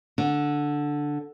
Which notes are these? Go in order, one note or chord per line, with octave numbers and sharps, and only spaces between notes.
D3